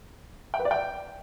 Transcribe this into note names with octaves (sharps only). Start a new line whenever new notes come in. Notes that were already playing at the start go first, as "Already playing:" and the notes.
G5
B4
D5
G5